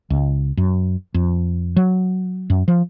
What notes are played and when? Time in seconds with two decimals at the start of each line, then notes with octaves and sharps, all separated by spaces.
0.10 C#2
0.57 F#2
1.14 F2
1.76 F#3
2.50 F#2
2.68 F3